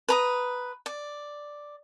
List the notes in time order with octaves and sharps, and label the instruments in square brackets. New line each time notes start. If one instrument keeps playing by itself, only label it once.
[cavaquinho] B4 A#5 D#6
D5